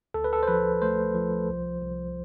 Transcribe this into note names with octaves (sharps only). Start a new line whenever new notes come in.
D2 A4
B4
A4
C5
F3 B4
A3 C5
F3
C2
C2